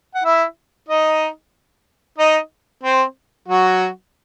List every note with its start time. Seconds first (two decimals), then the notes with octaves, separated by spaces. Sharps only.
0.14 F#5
0.24 E4 E5
0.89 D#4 D#5
2.18 D#4 D#5
2.83 C4 C5
3.48 F#3 F#4